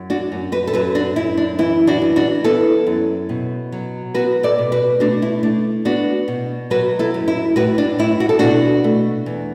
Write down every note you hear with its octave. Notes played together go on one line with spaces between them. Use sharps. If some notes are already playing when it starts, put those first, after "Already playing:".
Already playing: F#2
D4 F#4
F#2
F#4 B4
A4
F#2 F#4 B4
D4 F#4
F#2 E4
D4
E3 E4
D4 F#4
E3
D4 F#4
B3 E4 A4
F#2
B2
F#3
B3 F#4 B4
A4 D5
B2
F#4 B4
A3 D4 F#4
E4
A3 D4
B3 D4 F#4
B2
F#3 F#4 B4
E4 A4
F#2
E4
A2 F#4 B4
D4
A2 E4
F#4
A4
B2 D4 F#4
A3
E2